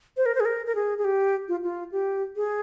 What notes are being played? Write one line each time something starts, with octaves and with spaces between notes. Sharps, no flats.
C5
A#4
C5
G#4
A#4
A#4
G#4
G#4
G4
F4
F4
G4
G#4